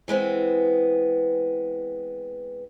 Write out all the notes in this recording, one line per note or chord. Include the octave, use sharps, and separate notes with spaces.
E3 G#3 B3 C4